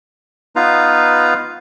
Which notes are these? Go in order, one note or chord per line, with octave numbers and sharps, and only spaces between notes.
B3 D#4 F4 B4 F5 A#5